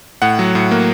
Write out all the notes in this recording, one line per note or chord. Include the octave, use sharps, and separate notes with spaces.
A2 F#5
F#3
A2
A#3